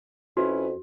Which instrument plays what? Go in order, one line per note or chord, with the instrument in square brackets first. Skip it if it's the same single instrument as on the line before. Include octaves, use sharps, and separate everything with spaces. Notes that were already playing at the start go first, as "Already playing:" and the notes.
[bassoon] F2 [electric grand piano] C#4 E4 B4 [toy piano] F#4